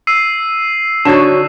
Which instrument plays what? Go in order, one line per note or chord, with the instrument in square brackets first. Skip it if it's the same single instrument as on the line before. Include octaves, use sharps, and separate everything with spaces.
[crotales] E6 C7 D#7
[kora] D3 D#4 [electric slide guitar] F#4 C#5 A5